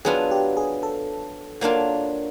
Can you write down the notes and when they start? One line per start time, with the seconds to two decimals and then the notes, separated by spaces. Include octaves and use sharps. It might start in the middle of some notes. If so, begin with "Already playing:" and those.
0.05 F#3 B3 D4 F4 G#4
0.31 G4
0.57 G#4
0.83 A4
1.61 F#3 A#3 D4 F4